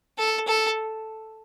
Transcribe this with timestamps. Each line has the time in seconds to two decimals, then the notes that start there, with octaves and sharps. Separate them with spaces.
0.18 A4
0.48 A4